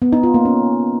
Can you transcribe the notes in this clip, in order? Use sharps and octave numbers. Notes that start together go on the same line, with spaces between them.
B3
D#4
F4
A#3
C#4